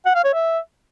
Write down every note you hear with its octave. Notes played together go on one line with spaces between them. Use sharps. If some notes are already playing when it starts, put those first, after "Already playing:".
F#5
F5
C#5
E5